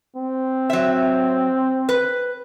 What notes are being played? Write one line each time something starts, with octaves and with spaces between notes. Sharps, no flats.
C4
F#3 E5
B4